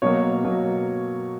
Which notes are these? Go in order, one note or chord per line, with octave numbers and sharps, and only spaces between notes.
B2 F#3 A#3 C#5
B2 F#3 A#3